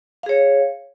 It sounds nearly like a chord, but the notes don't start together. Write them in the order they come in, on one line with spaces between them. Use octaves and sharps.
F5 G#4 C#5